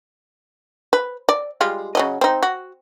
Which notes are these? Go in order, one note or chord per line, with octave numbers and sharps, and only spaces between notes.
B4
D5
G3 G#3 F4
C#3 F#3 D#5
C4 D#4
F#4